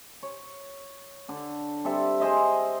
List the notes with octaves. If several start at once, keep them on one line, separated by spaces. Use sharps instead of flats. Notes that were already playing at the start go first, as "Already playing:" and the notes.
C#5
D3 D4
G3 C4 A4 E5
G#4 C5 D#5 E5